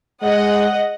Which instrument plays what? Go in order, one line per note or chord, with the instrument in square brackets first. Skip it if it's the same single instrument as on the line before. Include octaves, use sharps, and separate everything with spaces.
[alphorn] G#3 [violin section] D#5 F#5